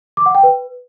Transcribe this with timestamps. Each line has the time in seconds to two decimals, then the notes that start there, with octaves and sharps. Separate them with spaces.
0.17 D6
0.26 F#5
0.35 G5
0.43 B4